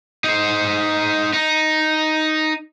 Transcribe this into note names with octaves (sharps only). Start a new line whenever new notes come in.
D#4 C5
D#4